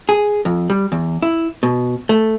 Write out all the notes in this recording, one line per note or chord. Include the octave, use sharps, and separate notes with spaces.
G#4
F2
G3
E2
E4
B2
A3